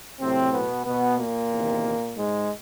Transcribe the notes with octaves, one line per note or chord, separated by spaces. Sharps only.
A2 C3 F#3 C4
B2 B3
B2 B3
A#2 A#3
E2 C3 D#3
G#2 G#3